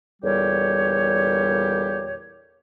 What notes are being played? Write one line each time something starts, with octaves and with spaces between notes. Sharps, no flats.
E2 A#2 D3 G3 G4 C#5